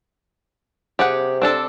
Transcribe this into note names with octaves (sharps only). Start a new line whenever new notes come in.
C3 G4 G#4 F#5
C4 D4 A4